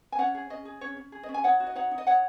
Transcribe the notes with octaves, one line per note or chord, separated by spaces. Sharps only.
G#5
C#4 C#5 F#5
G#4
C#4 D#5
G#4
C#4 C#5
C#4
G#4
D#5
C#4
G#5
D#4 C#5 F#5
F#4
D#5
D#4 C#5 F#5
D#4
D#5
D#4 C#5 F#5